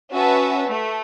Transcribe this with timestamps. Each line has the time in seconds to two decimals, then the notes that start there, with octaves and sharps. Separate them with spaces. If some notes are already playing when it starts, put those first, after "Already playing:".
0.13 C#4 F#4 B4 E5 A5
0.71 A3